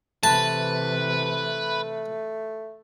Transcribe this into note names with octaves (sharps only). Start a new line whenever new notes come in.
C3 E3 A3 B4 A5